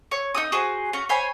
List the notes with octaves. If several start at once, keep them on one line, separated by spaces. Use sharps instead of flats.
C#5
D#4 F#4 D#6
F#4 G#4 C5
C#4 F#4
C5 C#5 G#5 B5